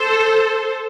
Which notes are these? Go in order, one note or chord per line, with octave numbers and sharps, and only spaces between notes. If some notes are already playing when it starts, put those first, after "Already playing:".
Already playing: A4 C5